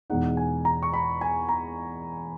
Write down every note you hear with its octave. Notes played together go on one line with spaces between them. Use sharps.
E2 B2 G#3 D#4 F#5
G#5
A#5
C#6
B5
G#5
A#5